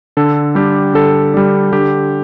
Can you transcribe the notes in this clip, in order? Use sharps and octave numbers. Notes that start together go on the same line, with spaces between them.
D3 A4
G3 D4 G4
D3 A4
G3 D4
D3 G4